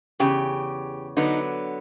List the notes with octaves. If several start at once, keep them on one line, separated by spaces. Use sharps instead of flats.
E2 C#3 G4
D3 F#3 B3 D#4